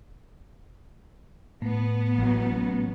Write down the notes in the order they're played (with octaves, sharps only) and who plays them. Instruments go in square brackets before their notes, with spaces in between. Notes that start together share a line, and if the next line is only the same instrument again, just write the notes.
[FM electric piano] A2 [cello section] B3
[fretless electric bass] A1 F#3